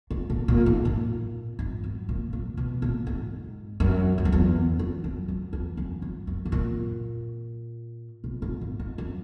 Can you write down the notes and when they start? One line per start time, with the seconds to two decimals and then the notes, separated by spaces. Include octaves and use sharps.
0.11 G#2
0.30 A#2
0.48 A#2
0.66 G#2
0.85 A#2
1.59 G#2
1.84 F#2
2.09 A#2
2.33 A#2
2.57 B2
2.82 A#2
3.07 G#2
3.80 F#2
4.18 E2
4.25 F#2
4.32 E2
4.79 F#2
5.04 F#2
5.28 F#2
5.53 E2
5.77 F#2
6.02 G#2
6.27 F#2
6.45 G#2
6.52 A#2
8.24 B2
8.42 G#2
8.61 A#2
8.80 G#2
8.98 F#2